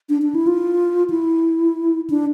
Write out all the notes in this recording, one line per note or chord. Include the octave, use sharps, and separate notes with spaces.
D4
D4
E4
F4
E4
D4